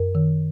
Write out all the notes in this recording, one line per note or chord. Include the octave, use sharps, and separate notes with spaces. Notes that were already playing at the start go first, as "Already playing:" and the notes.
Already playing: F#2 A#4
D#3